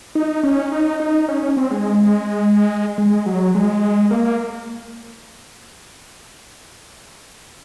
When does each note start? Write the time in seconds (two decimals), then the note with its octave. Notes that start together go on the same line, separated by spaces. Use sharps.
0.15 D#4
0.43 C#4
0.72 D#4
1.00 D#4
1.28 C#4
1.42 C#4
1.57 C4
1.71 G#3
2.98 G#3
3.26 F#3
3.55 G#3
4.11 A#3